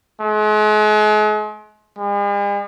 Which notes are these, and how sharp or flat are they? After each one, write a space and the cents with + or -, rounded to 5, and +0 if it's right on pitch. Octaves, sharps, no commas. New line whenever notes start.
G#3 +40
G#3 -45